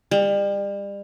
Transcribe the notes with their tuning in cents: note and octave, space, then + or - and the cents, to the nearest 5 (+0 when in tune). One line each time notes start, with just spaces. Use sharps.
G3 +35